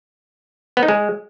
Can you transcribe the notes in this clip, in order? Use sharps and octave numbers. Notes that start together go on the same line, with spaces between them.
B3
D#4
G#3